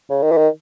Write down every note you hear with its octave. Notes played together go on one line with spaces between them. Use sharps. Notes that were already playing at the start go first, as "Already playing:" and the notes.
C#3
D#3
E3
D#3